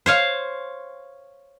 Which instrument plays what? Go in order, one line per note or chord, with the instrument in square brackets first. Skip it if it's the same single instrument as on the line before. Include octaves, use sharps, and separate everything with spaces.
[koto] C5 C#5 F5